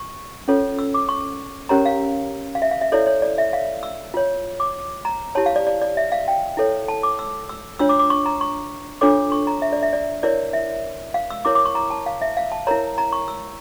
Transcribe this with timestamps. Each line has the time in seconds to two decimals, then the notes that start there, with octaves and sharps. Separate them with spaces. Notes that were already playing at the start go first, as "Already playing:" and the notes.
Already playing: C#6
0.48 C#4 F4 A4 C#5
0.79 E6
0.94 D6
1.09 C#6
1.69 C#4 G4 A#4 C#5 A#5
1.86 F5
2.55 F5
2.62 E5
2.71 F5
2.81 E5
2.92 E4 A4 C#5 D5
3.07 C#5
3.22 D5
3.38 E5
3.53 F5
3.83 E6
4.14 F4 C#5
4.60 D6
5.05 A#5
5.35 E4 G4 C#5 A5
5.46 F5
5.56 D5
5.67 D5
5.81 D5
5.97 E5
6.12 F5
6.28 G5
6.57 E4 A4 C#5
6.88 A5
7.03 D6
7.19 E6
7.49 E6
7.79 D4 F4 C#5 E6
7.89 D6
7.99 D6
8.10 C#6
8.26 A#5
8.41 C#6
9.01 D4 F4 A4 C#5 D6
9.32 C#6
9.47 A#5
9.62 E5
9.73 D5
9.82 E5
9.93 D5
10.23 E4 A#4 C#5 D5
10.53 E5
11.14 F5
11.30 E6
11.45 E4 A#4 C#5 D6
11.55 D6
11.65 C#6
11.75 A#5
11.90 A5
12.06 F5
12.21 E5
12.37 F5
12.52 A5
12.67 E4 A#4 C#5 A#5
12.98 A#5
13.12 C#6
13.28 E6